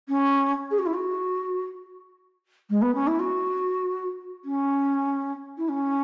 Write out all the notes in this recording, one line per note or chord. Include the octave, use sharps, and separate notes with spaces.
C#4
G#4
F#4
E4
F#4
G#3
B3
C#4
E4
F#4
C#4
E4
C#4